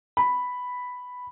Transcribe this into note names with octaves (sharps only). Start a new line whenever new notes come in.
B5